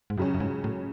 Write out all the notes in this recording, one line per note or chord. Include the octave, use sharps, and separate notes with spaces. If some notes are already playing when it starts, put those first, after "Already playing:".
G#2
C#2 F#2 C#3 F#3 C#4
F#2
G#2
A2